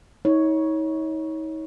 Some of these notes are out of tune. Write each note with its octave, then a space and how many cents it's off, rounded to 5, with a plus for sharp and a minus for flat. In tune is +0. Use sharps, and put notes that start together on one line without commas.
D#4 +40 C#5 +0